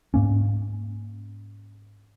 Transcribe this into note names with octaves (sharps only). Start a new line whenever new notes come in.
G#2 A#3 C#4